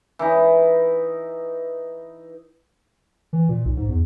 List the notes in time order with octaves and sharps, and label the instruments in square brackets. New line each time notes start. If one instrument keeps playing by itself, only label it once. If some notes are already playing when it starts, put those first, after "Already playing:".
[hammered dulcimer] E3 D#4
[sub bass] E3
A#2
B1
G#2
E2